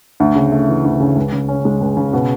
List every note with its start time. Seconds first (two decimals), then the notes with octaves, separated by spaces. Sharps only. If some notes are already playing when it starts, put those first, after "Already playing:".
0.20 D2
0.35 C#3
0.52 A3
0.68 E3
0.84 D2
1.00 C#3
1.16 C#2
1.32 C#3
1.48 C#4
1.65 G#3
1.81 C#2
1.97 C#3
2.13 B2